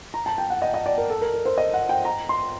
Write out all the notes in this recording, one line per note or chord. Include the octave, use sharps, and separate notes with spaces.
A#5
A5
G5
F#5
D#5
D#5
D5
A#4
A4
A#4
A#4
C5
D#5
F#5
G5
A#5
C6